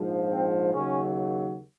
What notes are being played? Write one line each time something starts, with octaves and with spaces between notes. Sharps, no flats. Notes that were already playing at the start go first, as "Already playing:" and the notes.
Already playing: A#1 G#2 F3
C4
D#2 C#3 F#3 C#4